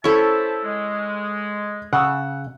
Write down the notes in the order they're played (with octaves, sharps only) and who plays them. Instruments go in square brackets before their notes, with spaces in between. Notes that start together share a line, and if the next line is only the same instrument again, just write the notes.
[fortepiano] C#4 E4 [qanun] A4 C#6 [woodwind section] C5 E5 A5
[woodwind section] G#3
[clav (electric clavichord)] C#3 [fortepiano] F#5 E6